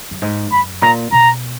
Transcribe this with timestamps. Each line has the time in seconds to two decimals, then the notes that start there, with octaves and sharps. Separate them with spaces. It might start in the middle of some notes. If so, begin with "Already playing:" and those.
0.11 F#2
0.22 G#2
0.52 F#2 B5
0.82 A#2 A#5
1.12 B2 A#5